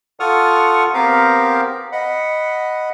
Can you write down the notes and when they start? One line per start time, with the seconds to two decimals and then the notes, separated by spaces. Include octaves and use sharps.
0.20 F4 A4 F#5 C#6 D#6 F6
0.94 B3 C4 G4 A#4 F5 A#5
1.92 D#5 F#5 B5